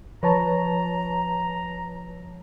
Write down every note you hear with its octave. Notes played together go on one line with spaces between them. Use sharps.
F3 B4 C#5 A5 A#5